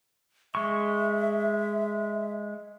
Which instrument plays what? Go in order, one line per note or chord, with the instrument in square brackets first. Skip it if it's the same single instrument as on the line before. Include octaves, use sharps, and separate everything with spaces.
[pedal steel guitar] G#3 C#6 [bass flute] E5